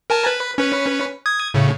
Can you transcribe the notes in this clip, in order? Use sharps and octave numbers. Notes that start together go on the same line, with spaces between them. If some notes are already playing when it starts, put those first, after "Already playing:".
A#4 G#5 A5
B4
C#4 B4
D#6 G#6
A2 C#3